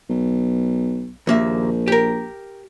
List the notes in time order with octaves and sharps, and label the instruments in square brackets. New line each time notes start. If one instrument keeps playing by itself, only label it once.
[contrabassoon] B1
[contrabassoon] A#1 [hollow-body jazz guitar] D#2 A#3 E5
[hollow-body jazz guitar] G4 A#4